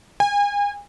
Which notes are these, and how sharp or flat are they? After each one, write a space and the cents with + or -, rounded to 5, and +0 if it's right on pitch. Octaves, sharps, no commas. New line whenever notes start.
G#5 -35